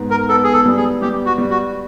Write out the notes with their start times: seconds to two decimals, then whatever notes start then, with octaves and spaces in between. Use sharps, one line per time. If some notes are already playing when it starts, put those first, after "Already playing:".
Already playing: G#2 B3
0.11 A#4
0.29 B3 A4
0.44 G#4
0.53 A4
0.66 G3
0.77 G#4
1.01 G3 G4
1.26 F#4
1.38 G3
1.51 F#4